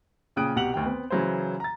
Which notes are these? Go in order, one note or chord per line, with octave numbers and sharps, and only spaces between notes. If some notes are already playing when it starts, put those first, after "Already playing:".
A#2 C#3 G5 D#6 F#6 D7
C2 B2 G4 F#5 F7 F#7
D2 D#3 G5
B3 C4
C#3 E3 F#3 E4 C5
A#5 A6